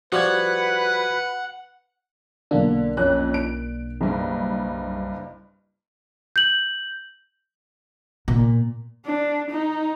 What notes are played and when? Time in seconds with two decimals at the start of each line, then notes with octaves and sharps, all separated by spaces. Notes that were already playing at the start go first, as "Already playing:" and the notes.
0.12 F3 G3 F#4 B4 F#5 G#6
2.51 B1 D3 A#3 D4
2.97 F2 C#4 F#6
3.34 D7
4.01 F#1 G2
6.36 G6 F#7
8.28 A#2
9.06 D4
9.50 D#4